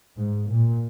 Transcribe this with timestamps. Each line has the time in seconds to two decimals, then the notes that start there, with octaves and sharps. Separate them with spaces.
0.17 G#2
0.48 A#2